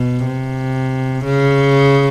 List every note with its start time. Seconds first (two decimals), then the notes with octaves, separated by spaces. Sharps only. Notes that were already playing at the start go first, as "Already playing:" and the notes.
Already playing: B2
0.26 C3
1.25 C#3